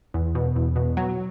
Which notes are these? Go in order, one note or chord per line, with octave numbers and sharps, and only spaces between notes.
E2
B2
E2
B2
F#3